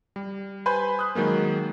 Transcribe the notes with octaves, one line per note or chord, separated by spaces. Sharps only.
G3
B4 C5 G#5 B5 C6 G6
D#6 F#6
D#3 F#3 G#3 A#3